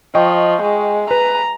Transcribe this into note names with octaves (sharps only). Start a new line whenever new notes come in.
F3 D#5 G5 C#6
G#3
B4 A#5